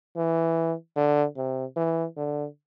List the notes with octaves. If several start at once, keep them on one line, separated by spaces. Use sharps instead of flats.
E3
D3
C3
E3
D3